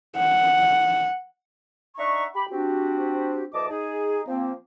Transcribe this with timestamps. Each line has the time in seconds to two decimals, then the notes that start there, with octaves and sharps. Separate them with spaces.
0.17 F#5
1.96 D4 D#4 E5 F#5 A#5 C#6
2.34 G4 B5
2.50 C4 D4 F#4 G4
3.53 D2 E3 D#5 A5 D6
3.68 D#4 G#4
4.27 F3 A#3 C4